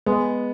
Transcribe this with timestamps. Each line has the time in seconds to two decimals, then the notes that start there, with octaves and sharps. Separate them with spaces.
0.06 G#3 B3